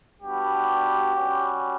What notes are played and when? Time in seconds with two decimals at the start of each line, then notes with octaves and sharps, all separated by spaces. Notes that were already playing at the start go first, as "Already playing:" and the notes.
0.21 G3 B3 D4 F#4 G4
1.14 G3 C#4 F#4